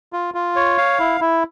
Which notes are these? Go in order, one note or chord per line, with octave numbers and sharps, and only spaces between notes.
F4
F4
C#5
F5
E4
E4